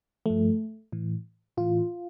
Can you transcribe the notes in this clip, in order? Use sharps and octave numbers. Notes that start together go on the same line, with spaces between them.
G2 F3 A3
A2 E3
A2 E3 F4